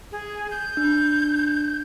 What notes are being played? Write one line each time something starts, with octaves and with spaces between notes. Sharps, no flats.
G#4
G6
D4